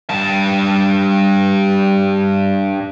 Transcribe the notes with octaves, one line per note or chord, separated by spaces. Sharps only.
G2 A5